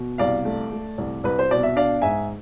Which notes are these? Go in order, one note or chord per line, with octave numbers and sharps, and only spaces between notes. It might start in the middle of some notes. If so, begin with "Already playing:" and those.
Already playing: B2
C2 D5 F5
A3
A3
C2
C2 B4
C5
B2 D5
E5
D4 D5 F5
G#2 E5 G#5